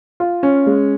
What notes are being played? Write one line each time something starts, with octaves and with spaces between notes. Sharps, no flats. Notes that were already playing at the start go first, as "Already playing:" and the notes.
F4
C#4
G#3